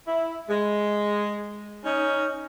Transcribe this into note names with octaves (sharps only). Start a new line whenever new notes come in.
E4
G#3
C#4 D#4